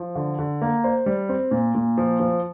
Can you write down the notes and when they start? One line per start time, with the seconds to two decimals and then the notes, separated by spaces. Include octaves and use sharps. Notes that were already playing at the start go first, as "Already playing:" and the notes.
Already playing: F3
0.16 D3
0.39 D3
0.62 A#3
0.84 C5
1.06 G3
1.29 C4
1.51 A#2
1.75 A#2
1.98 F3
2.20 F3